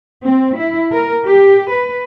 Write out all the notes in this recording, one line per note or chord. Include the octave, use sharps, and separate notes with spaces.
C4
E4
A#4
G4
B4